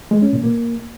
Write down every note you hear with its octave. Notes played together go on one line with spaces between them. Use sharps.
G#3
C#4
A#2
A#3